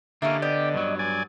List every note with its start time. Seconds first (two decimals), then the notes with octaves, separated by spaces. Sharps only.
0.22 D3 A#3 C#4 E4 G4 D#5
0.42 B3 G4 D5 D#5
0.74 G2 F#3
0.99 D5 G#5